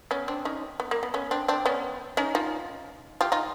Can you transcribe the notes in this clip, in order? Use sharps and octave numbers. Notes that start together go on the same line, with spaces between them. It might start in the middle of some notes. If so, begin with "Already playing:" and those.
B3 C#4
C4 D4
C#4 D#4
B3
A#3
B3
B3 C#4
C4 D4
C4 D4
B3 C#4
C#4 D#4
D#4 F4
F4 G4
D#4 F4